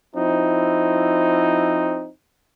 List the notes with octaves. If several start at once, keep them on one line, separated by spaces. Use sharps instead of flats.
F3 C4 D#4 E4